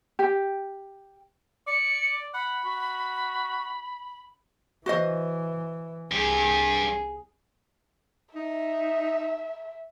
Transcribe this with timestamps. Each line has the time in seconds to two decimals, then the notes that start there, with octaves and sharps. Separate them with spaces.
0.19 G4 G5
1.67 D5 C#7
2.34 F#5 B5
2.65 F#4
4.86 E3 F#4 C5 D#5
6.11 C2 G2 G4 G#4
8.35 D#4 E5